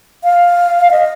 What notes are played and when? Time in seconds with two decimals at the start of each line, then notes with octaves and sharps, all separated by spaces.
0.24 F5
0.91 D#5